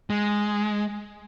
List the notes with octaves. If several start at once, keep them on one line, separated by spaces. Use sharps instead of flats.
G#3